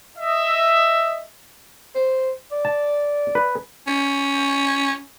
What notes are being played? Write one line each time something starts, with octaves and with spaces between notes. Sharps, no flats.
D#5 E5
C5
D5
A5
B4
C#4